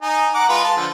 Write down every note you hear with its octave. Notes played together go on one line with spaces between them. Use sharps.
D#4 G#5
F#5 A#5 D6
G#3 F4 B4
A5 C6
D3 F3